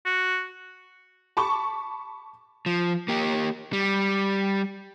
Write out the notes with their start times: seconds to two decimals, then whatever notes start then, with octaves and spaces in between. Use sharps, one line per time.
0.06 F#4
1.37 A5 B5 C#6 D6
2.66 F3
3.08 A#3 G4
3.73 G3